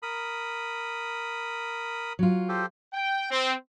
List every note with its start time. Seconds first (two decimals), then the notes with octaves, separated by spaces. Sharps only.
0.03 A#4 B5 D#6
2.19 F#3 F4
2.49 G4 A4 C5
2.93 G5
3.30 C4